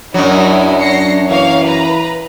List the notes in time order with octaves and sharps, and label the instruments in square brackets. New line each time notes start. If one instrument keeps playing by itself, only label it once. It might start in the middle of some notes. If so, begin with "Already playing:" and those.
[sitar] F#2 F#3 [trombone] D4 [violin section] E4 D#5
[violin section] A#6 C7 C#7
[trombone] E3 [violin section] A#3 C#5 F5
[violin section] B4 A#5